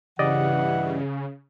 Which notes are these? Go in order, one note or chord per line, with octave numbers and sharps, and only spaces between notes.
G2 C#3 E3 G4 D5 D#5 F#5